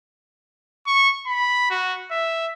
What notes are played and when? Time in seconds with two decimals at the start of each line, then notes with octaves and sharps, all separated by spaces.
0.87 C#6
1.27 B5
1.71 F#4
2.11 E5